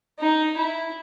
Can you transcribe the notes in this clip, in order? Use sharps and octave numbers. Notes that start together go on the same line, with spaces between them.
D#4
E4